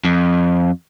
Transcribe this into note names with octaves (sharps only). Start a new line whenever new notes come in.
F2